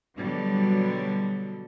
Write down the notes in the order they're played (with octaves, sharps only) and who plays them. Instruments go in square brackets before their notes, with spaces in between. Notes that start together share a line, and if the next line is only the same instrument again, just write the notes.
[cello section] B2 D3 F#3 G3